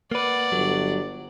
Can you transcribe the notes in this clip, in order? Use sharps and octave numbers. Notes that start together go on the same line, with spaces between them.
A#3 B4 D5 F#5
G1 F#3